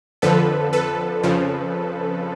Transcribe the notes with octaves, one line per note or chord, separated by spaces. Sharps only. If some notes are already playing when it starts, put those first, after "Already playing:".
F2 D3 F3 A4 B4
A4 B4
F2 C#3 F3